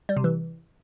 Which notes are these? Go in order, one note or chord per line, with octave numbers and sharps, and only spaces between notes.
G3
C3
E3